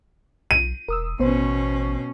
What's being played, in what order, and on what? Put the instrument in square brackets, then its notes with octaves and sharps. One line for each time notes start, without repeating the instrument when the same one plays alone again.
[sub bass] B1 [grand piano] D#7
[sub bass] E1 [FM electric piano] A#4 D#6 E6
[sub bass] A1 [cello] B2 C#4 [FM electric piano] B3 C5